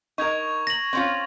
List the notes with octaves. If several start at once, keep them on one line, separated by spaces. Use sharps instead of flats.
D#4 A#4 C#6 G#6 F7
A#6 F#7
C4 C#4 F4